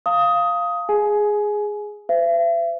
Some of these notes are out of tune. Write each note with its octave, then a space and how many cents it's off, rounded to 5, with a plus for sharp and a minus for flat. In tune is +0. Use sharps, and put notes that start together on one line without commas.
F5 +0 A5 +45 D#6 +15
G#4 +0 G#5 +20
C5 -40 E5 +40